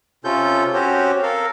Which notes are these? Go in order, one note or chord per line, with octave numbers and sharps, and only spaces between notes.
C3 C#4 F4 A4 G6
C4 C#4 F#4 G4 C5 C#5
A4 A#4 F5